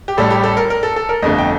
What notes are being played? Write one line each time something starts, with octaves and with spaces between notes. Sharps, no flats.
G4
A1 A2 G3 A4
G4
A4
A#4
A#4
A4
A4
A#4
G1 F2 D3 A3 D#5
G5